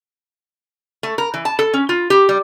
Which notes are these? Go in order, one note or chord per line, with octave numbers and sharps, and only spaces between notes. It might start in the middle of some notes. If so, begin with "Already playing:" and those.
A3
A#4
E3
A5
A4
C#4
F4
G4
G3